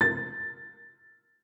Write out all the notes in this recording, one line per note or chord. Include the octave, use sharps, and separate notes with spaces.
A6